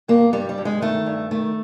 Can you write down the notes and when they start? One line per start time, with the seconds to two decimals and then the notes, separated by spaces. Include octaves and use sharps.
0.08 G2 A#3
0.33 G2 G3
0.49 G3
0.58 G2
0.65 G#3
0.82 D#3 A3
1.06 G2
1.31 D#3 A3